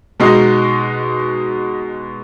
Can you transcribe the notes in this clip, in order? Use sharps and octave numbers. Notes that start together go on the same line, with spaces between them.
B2 G#3 D#4 F#4